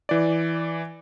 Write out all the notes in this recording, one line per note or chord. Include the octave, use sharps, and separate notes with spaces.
E3 D5